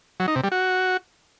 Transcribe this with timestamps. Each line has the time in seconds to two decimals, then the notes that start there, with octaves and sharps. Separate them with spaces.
0.20 F#3
0.28 D#4
0.36 C3
0.44 G3
0.52 F#4